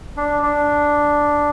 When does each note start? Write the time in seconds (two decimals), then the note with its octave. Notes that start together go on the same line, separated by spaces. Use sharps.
0.17 D4
0.43 D4